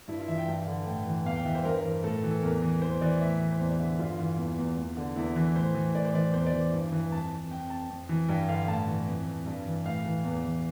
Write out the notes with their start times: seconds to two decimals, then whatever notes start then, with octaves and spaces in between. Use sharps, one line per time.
0.08 G2 E4
0.19 F4
0.28 E3 E5
0.38 G5
0.48 G2
0.67 D3
0.87 A2 G5
1.07 E3
1.26 E2 F5
1.36 G5
1.45 E3 E5
1.55 C5
1.65 G2 A#4
1.74 C5
1.82 E3 A#4
2.04 A2 A4
2.24 E3
2.31 A4
2.43 E2 A#4
2.62 E3
2.82 E2 C5
3.01 E3 D5
3.21 A2 E5
3.41 E3
3.52 C5
3.60 E2
3.66 D5
3.80 D3 E5
3.99 G2 F4
4.19 E3
4.38 E2
4.58 E2
4.78 E2
4.97 D3
5.16 E2 E4
5.36 E3
5.56 A2 C5
5.75 E3
5.95 A2 D5
6.05 C5
6.14 E3 D5
6.34 E2 C5
6.46 D5
6.53 E3
6.73 G2
6.92 E3
7.12 F2 A5
7.31 F2
7.51 F2 G5
7.70 F2 A5
7.90 F2
8.09 E3
8.29 G2 G5
8.48 D3 F5
8.68 A2 A5
8.88 E3
9.08 F2
9.27 F2
9.46 G2
9.66 E3
9.85 A2 F5
10.05 E3
10.24 E2
10.44 E3